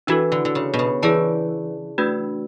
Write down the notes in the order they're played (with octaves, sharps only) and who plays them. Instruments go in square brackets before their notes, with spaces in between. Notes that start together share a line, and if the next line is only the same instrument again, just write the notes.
[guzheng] E3 [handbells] D4 F#4 A4
[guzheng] D3
D3
C#3
B2
C#3
[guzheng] E3 [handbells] G#4 D5 A5
[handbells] A3 D4 F#4 B4